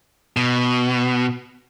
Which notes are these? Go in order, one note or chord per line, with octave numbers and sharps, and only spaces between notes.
B2